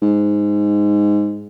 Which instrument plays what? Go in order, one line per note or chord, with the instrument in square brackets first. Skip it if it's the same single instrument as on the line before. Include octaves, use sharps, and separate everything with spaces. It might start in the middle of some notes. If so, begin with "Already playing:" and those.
[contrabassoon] G#2